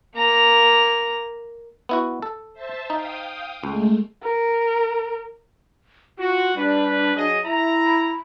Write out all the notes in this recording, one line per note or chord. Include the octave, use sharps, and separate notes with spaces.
A#3 A#5
B3 E4 F#4
A4
C5 E5 A5
D#4 F5 G5 D#6
C#2 G#3 A3
A#4
F4 F#4
G3 D4 B4
F#3 G#4 D#5
E4 E5 A#5
B5